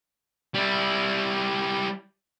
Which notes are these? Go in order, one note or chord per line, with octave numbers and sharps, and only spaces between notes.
G3 E4